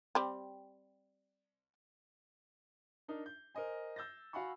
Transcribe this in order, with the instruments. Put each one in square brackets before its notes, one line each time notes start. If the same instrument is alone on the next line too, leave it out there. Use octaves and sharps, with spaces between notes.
[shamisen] G3 C4
[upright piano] D4 D#4 A#4
G6
A#4 C5 D#5 G#5
E6 G6 A6 A#6
F#4 F5 F#5 G#5 B5 C#6